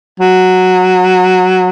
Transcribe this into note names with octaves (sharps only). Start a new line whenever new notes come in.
F#3